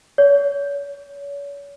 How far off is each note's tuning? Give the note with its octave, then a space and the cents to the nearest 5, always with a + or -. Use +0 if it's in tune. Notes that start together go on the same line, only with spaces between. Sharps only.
C#5 +40